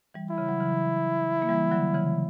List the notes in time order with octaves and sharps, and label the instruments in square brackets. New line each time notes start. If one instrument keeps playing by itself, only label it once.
[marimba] E3 G3
[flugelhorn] E4
[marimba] C#3
F#3
C#3 E3
A#3
E3 G3
D3 F#3
C#3 E3